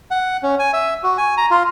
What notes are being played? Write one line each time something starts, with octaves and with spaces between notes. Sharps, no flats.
F#5
C#4
G#5
E5
F#4
G#5
A#5
F4